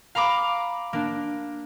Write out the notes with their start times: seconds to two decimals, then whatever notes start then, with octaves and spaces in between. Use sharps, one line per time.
0.15 F5 A#5 B5 D6
0.93 A#3 D4